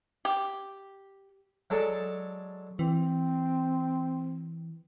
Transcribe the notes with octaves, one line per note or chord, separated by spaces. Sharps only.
G4
F#3 G#3 A4 C#5 D5 A5
E3 C4